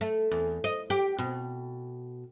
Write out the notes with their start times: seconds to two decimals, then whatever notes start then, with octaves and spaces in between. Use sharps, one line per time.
0.01 A3
0.31 E2
0.64 D#5
0.90 G4
1.18 B2